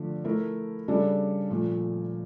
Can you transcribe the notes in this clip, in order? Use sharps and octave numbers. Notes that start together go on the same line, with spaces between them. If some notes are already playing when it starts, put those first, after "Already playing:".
Already playing: D3 F3 A3
A3 E4 A#4
C#3 G3 D4 A4
A#2 F3 A3